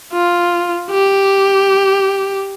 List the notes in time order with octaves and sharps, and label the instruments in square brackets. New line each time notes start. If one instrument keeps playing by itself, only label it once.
[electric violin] F4
G4